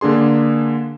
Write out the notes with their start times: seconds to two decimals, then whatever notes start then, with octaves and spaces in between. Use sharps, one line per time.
0.01 D3 A#3 D4 G#4 C6